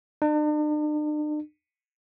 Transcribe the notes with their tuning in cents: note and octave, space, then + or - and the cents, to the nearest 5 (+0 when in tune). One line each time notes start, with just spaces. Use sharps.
D4 +45